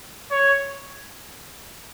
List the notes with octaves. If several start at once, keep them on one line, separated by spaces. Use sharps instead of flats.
C#5